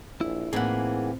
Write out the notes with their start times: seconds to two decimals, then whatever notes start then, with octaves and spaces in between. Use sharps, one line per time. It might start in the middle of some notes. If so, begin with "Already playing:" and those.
0.21 A#1 E4
0.53 A2 E3 A#3 C4 D#4 G#4 F#5